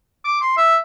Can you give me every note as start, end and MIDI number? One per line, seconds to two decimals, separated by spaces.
0.24 0.37 86
0.41 0.57 84
0.57 0.78 76